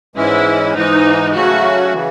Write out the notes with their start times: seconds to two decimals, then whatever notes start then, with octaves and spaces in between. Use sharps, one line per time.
0.16 G#2 E3 G#3 C#4 E4
0.75 G#2 E3 G#3 D#4
1.34 C#3 F#3 A3 C#4 F#4
1.93 C#3 E3